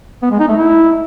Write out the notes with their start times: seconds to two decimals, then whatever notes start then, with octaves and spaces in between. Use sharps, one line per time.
0.23 B3
0.31 G#3
0.40 D#4
0.48 A3
0.57 E4